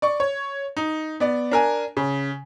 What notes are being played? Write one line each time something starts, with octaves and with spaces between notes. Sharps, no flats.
D5 C#6
C#5
D#4
B3 D5
D4 A#4 G#5
C#3